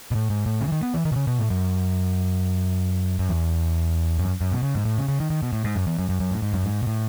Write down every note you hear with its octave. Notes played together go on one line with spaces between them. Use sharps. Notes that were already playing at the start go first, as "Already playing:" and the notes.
B2
A2
G#2
A2
C#3
E3
D#3
B3
E3
D#3
B2
C#3
B2
A2
F#2
F#2
E2
F#2
F#2
B2
C#3
G#2
A2
C#3
C#3
D#3
D#3
B2
A2
G#2
F#2
E2
F#2
F#2
F#2
A2
G#2
F#2
G#2
B2
A2